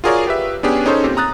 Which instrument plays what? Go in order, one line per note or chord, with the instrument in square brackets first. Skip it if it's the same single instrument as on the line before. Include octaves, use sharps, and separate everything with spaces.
[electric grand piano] F4 F#4 G#4 A#4 C#5 D5
G4 B4 E5
B3 C#4 D4 G4 G#4
C#4 D#4 G#4 A4 C5 C#5
A#2 C4 G4
A#5 D#6 F#6 A6